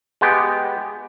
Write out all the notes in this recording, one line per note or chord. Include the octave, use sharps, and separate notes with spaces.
G#3 B3 G4